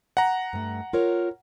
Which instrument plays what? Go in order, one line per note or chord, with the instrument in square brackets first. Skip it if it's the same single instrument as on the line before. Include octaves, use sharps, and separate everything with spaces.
[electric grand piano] F#5 A#5
[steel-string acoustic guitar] G2 A3
F4 A#4 C#5